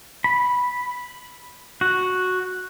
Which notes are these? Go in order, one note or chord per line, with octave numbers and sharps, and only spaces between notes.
B5
F#4